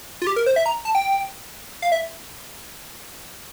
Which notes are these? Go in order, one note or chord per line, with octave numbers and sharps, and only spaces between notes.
F4
G4
A#4
C5
E5
A#5
A5
G5
F5
E5